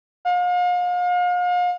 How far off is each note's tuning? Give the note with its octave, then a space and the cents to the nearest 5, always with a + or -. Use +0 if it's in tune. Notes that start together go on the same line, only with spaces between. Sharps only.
F5 +40